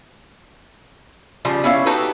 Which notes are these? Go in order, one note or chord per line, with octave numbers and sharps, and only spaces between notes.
C#3 F3 G3
B3 C#4 E4 C#5 F5
D#4 F#4 G4 A4 B4